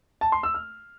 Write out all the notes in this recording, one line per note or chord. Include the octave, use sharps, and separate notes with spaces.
A5
C6
E6
F6